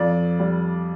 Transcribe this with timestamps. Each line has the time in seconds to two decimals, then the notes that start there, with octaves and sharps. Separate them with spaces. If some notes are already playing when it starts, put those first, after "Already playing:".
Already playing: F2 D5
0.39 G3